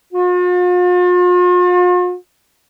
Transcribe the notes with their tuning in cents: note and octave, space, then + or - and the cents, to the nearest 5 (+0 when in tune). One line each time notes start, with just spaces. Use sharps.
F4 +45